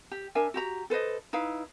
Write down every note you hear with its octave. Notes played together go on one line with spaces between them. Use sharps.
G4
D4 A#4 E5 G#5
F#4 G4 A#5
A4 B4 C5 D#5
D#4 E4 B4 F5